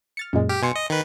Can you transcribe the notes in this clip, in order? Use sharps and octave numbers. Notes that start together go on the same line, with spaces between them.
F6 A6 C#7
F#2 A#2 G#3
G4 F6 B6
B2 G#5 C6 C#7
D#5
D#3 B4